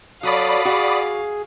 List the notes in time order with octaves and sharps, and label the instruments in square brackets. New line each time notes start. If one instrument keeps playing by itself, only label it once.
[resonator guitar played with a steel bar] F#3 [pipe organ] F#4 A4 C#5 [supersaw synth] D5 B5 D#6 [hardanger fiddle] F5
[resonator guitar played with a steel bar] F#4 [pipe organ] G#4